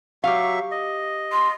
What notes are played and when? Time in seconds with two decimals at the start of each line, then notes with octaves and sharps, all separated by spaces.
0.24 F#3 G4 E5 F5 C#6
0.71 D#5
1.33 C6